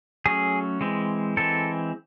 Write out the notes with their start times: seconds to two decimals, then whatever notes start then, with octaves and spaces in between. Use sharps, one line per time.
0.26 F#3 A3 C#4 G#4
0.81 E3 G#3 C4
1.37 E3 G#3 C4 A4